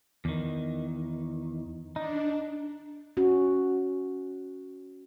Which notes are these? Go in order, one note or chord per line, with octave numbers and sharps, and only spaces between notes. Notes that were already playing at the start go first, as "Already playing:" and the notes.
E2 D#3
D4 D#4
C#4 F#4